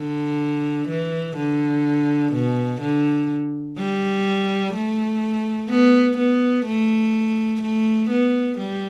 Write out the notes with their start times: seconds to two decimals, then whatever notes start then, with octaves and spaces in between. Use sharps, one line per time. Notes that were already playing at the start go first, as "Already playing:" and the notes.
Already playing: D3
0.88 E3
1.36 D3
2.33 B2
2.81 D3
3.78 G3
4.74 A3
5.70 B3
6.18 B3
6.66 A3
7.62 A3
8.10 B3
8.58 G3